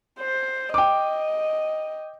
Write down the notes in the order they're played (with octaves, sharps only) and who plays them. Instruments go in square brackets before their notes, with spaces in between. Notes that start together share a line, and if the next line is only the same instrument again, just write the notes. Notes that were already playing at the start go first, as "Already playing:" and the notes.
[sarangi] C5
[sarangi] D#5 [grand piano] G5 D6